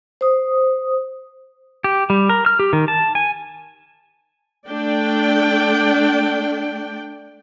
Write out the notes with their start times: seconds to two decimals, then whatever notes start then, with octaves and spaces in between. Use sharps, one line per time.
0.21 C5 D#6
1.84 G4
2.10 G3
2.29 A#4
2.46 F6
2.59 G4
2.73 D#3
2.88 A5
3.15 G#5
4.68 A3 D4 D5 G5